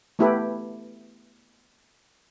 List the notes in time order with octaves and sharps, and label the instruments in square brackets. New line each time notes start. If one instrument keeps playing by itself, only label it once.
[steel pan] A3 B3 E4 G4 A4 B4